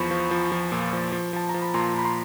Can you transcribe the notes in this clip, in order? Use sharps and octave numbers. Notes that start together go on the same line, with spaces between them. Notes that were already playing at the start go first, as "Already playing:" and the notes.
Already playing: E2 F3 B5 C#6
F3
F3
F3
A#2
F3
F3
F3 A5
A#5
F3
B5
A#2 A#5 C6
A#2 B5
A#5 C6